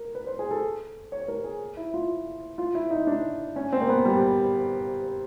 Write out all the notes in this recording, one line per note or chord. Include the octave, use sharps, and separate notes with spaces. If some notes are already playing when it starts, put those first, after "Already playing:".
Already playing: A#4
B4
C5
G#4
A4
C#5
A#4
G#4
E4
F4
F4
E4
D#4
D4
C#4
C4
A#3
B3
G3